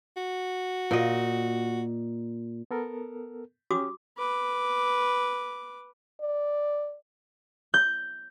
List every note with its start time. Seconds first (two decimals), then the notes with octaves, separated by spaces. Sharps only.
0.16 F#4
0.91 A#2 D#5
2.71 B3 A4 A#4
3.71 C#4 F#4 G4 D6 D#6
4.18 B4 D6
6.21 D5
7.74 G6